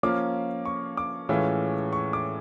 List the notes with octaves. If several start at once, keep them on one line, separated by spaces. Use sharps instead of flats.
F3 A#3 C#4 F4 D6
C#6
D6
A2 E3 G#3 C#4 F4
C#6
D6